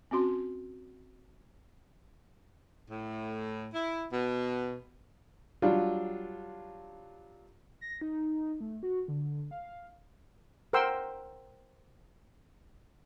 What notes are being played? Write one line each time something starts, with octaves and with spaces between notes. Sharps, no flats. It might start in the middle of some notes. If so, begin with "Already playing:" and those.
C4 C#4 F#4 C6
A2
E4
B2
F#3 G3 D4 F4
A#6
D#4
A3
F#4
D3
F5
A#4 C5 F#5 G5 C6 E6